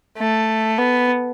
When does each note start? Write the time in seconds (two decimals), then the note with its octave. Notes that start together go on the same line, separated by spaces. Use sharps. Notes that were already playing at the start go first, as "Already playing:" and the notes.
0.18 A3
0.78 B3